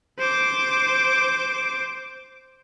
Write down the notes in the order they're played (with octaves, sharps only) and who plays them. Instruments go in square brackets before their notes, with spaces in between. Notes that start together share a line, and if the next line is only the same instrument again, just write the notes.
[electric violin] C5 D6